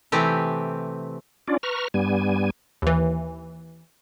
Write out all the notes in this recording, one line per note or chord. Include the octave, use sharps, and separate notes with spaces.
C3 E3 A3 C4 G4
C#4 D4 F4 D5
B4 A#5 C#6 F6
G2 G3 B3 G#5
D#2 E3